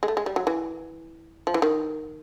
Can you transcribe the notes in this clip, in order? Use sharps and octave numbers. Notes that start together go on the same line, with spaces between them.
G#3
A3
G#3
G3
F#3
E3
F3
E3
D#3